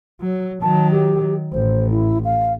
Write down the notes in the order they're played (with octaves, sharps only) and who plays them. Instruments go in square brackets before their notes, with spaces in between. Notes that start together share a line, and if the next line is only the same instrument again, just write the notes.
[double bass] F#3
[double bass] D#3 F#3 [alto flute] A5
[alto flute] G4
[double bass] A1 [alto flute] C5
[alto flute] E4
F5